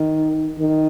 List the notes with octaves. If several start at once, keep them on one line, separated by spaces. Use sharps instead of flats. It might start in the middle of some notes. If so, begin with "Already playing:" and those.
Already playing: D#3
D#3